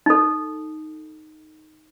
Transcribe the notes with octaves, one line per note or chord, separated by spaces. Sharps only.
D#4 A4